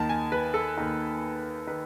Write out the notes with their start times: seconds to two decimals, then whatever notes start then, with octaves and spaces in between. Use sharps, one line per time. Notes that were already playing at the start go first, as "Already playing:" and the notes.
Already playing: D#2 D#3 A5
0.09 G#5
0.32 B4
0.54 A4
0.77 D#2 D#3
1.67 D#3 B4